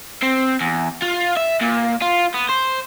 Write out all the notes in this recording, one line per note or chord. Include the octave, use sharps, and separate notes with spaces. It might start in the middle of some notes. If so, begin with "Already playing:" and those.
C4
E2
F4
E5
A#2
F4
B3
C5